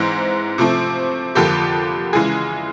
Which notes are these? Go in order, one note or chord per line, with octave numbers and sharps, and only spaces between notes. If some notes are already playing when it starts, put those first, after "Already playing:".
Already playing: G#2 E3 G#3 C4
C3 F3 A3 C4
F2 D3 F3 A#3 G4 A4
C#3 E3 G#3 G#4